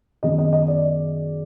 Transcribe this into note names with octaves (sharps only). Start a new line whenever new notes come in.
F#2 D#3 G#3 B3 D#5
D#5
D#5
D5